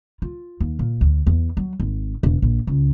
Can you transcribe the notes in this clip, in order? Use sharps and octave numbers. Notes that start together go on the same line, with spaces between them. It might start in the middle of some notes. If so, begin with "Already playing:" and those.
F4
D#2
A#2
D2
E2
F#3
G#1
E1
A#1
C#2